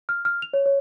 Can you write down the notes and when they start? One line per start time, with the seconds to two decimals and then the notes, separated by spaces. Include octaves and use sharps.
0.09 F6
0.25 F6
0.42 F7
0.54 C#5
0.66 C#5